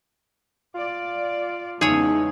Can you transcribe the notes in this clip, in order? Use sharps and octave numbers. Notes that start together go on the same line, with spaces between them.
F4 D5
E2 C#3 G#3 D#4 G#4 C#5